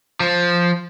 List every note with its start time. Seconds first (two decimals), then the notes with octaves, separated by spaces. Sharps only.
0.20 F3